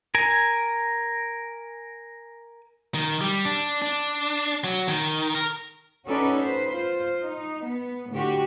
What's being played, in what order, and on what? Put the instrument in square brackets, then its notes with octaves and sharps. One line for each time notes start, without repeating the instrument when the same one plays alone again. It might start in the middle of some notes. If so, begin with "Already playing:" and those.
[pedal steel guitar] A#4 G#5
[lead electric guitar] D#3
G3
D4
D4
F#3
D#3
A#4
[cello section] C#4 D#4 F#4 A4 B4 D5
D#4 B4 C5
F4 C5
D#4
B3
A2 D3 F#4 G4